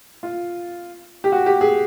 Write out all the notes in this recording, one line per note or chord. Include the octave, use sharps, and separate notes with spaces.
F4
G4
F#4
G4
G#4